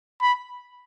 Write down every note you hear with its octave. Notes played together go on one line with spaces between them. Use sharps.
B5